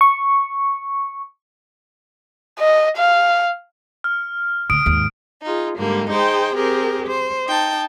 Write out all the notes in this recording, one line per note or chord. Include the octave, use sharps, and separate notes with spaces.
C#6
D#5
F5
F6
D2 D#6 D7
D#2 G#2
D#4 F4 G#4
G#2 D3 G3 A#3
D#4 G#4 C5 G5
C4 G4 G#4 A#4
C5
D#4 G5 A5